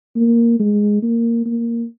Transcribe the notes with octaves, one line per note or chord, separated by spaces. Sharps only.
A#3
G#3
A#3
A#3